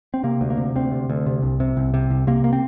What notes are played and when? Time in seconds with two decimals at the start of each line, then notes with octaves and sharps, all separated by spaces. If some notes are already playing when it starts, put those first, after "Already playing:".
0.14 C4
0.24 C3 A#3
0.41 D2
0.50 A#3
0.58 C3
0.75 D2 C4
0.92 C3
1.10 D2
1.26 C3
1.42 C2
1.60 C3
1.77 C2
1.94 C3
2.10 C2
2.27 C3 A#3
2.44 A#3
2.53 C4